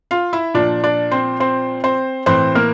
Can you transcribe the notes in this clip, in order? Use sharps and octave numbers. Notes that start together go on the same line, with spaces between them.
F4 F5
E4 E5
A#2 F3 D4 D5
D4 D5
C4 C5
C4 C5
C4 C5
A2 E3 C4 C5
A#3 A#4